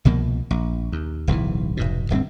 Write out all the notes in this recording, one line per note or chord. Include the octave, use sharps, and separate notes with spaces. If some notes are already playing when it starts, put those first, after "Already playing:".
C2 B2 F3 A#3
A#1
D#2
D1 B1 C3 E3
F1 G#2 B2
D1 G2 A#3 C4